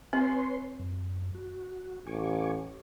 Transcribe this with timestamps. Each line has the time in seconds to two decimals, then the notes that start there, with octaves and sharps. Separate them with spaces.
0.13 C4 B4 C#5 C6
0.79 F#2
1.35 F#4
2.07 A1 G#5 C#6 D6